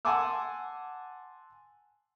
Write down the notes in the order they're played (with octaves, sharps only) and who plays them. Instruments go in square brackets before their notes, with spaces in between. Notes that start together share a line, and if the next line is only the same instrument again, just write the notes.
[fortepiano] F#5 G#5 A5 C6 D6 E6